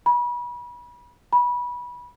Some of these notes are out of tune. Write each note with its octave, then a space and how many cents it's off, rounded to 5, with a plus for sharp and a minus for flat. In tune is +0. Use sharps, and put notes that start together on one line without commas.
B5 -35
B5 -25